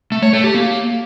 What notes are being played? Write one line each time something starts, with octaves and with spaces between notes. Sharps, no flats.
A3
C#5
A3
G4
A#3